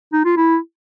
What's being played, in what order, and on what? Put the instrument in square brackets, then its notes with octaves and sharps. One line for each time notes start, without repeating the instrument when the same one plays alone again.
[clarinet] D#4
F4
E4